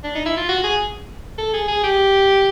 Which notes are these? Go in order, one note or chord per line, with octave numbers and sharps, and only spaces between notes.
D4
D#4
E4
F4
F#4
G#4
A4
G#4
G#4
G4